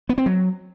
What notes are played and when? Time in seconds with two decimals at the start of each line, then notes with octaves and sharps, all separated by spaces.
0.09 B3
0.18 C4
0.26 F#3